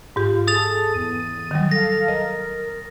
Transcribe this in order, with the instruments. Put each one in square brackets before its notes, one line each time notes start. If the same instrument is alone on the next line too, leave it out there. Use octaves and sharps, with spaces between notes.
[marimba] G#2 G4 [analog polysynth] F4
[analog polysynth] G#4 A4 [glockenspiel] D#6 A6 F7
[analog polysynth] E2 D#7
[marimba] D#3 F#3 G3
[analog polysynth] A4 F5 [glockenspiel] A#6
[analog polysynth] A#4 [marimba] D#5